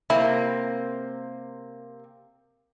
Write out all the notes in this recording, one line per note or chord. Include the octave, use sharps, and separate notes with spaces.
C3 A#3 C4 E4